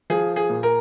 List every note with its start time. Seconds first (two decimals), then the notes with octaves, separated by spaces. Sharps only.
0.10 F3 G#4
0.36 G#4
0.50 A#2
0.63 A#4